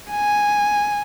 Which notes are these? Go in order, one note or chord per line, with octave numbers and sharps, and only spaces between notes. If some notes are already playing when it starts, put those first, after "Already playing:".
G#5